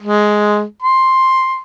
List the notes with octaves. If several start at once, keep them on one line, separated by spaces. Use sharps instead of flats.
G#3
C6